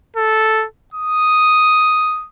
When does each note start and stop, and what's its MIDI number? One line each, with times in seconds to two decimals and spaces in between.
0.17 0.66 69
0.94 2.27 87